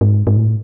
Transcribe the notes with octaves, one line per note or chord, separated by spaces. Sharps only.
G#2
G#2
A2